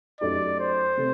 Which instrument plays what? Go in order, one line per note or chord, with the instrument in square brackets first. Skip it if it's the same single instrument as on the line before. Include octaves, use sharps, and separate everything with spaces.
[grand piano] F#2 F#3 A3 D#4 G4 [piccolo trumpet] D5
[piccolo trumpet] C5
[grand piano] C3 A3